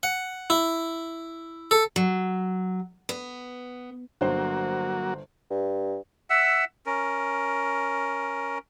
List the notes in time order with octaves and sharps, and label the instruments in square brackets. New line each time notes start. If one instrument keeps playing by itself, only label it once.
[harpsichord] F#5
E4
A4
[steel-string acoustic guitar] F#3
B3
[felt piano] G1 C5 [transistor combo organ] F#3 A#3 F#4
[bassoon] G2
[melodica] E5 F#5 E6
C#4 A#4